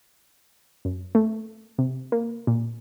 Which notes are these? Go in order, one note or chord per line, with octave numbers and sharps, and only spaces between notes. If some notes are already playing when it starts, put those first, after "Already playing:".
F#2
A3
C3
A#3
A#2